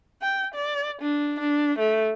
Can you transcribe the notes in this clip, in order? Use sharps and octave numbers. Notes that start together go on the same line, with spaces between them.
G5
D5
D4
D4
A3